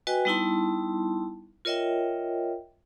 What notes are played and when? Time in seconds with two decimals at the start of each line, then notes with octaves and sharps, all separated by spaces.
0.07 F#4 B4 D#5 G5 G#5
0.25 G3 B3 D#4 E4 A5 C6
1.65 F4 A#4 C#5 D#5 E5 G5